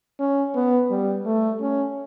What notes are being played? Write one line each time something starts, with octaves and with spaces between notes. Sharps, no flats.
C#4
B3
G3
A3
C#4